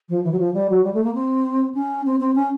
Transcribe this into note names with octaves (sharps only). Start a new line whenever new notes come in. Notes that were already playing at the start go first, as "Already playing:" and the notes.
F3
E3
F#3
F3
G3
F#3
G3
A3
A#3
C4
C#4
C4
C4
C#4